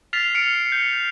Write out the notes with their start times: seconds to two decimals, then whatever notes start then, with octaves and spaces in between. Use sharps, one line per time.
0.13 F6 A6 B6 C7 F7
0.35 F6 C#7 D7 F7
0.72 G6